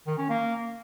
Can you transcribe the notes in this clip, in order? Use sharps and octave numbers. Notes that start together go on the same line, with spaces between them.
D#3
C#4
A#3